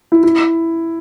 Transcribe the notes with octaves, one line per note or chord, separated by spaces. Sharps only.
E4
E4